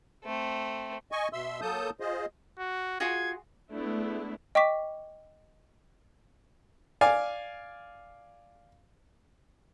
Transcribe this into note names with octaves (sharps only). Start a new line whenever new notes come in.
A3 C4
D#5 G#5 C#6
B2 E5 C6 E6
F#3 A#3 A4 A5 D#6 G6
F4 G#4 C5 D#5
F#4
F4 F#4 G#4 G#6
G#3 A3 B3 D4 E4
D#5 G5 C#6 D6 B6
D5 F5 G#5